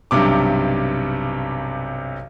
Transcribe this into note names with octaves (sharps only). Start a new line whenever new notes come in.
B1 G2 C3 D6